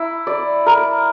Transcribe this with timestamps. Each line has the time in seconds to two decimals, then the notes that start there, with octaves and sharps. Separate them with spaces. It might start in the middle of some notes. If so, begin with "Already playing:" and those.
Already playing: E4
0.27 D5
0.66 A#4